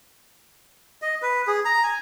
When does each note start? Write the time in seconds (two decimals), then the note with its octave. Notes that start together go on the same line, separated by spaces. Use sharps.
1.02 D#5
1.22 B4
1.47 G#4
1.65 A#5
1.83 G#5